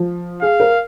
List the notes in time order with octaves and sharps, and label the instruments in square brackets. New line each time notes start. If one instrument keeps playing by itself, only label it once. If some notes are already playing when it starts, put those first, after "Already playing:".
Already playing: [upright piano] F3
[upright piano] G#4 [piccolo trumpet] F5
[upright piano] A#4